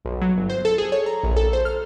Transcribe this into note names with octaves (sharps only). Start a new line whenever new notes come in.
B1
F#3
G1
C5
A4
G#4
C#5
A#5
A#1
A4
C5
F6